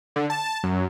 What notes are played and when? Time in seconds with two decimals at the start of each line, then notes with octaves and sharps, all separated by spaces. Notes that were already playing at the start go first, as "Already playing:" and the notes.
0.16 D3
0.30 A5
0.63 F#2